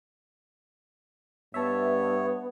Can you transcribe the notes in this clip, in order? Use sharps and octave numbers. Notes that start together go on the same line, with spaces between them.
G2 B3 C#5 E5 A5